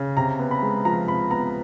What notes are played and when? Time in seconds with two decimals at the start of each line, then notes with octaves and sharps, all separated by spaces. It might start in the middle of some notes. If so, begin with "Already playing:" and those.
Already playing: C#3
0.17 C3 A#5
0.39 B3
0.51 B5
0.62 G#3
0.85 F3 A#5
1.08 C3 B5
1.30 B3 A#5